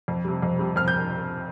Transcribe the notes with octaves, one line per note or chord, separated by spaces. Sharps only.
F2
C3 G3
F2
C3 G3
F2 F6
G6